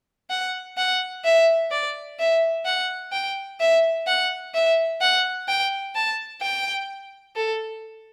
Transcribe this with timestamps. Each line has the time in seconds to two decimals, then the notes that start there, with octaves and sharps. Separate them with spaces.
0.30 F#5
0.77 F#5
1.24 E5
1.71 D5
2.20 E5
2.65 F#5
3.12 G5
3.60 E5
4.07 F#5
4.55 E5
5.01 F#5
5.48 G5
5.95 A5
6.42 G5
7.36 A4